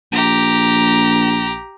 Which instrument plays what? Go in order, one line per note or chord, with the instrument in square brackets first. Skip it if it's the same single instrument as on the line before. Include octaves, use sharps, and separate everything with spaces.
[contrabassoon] A#1 [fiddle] G4 A#5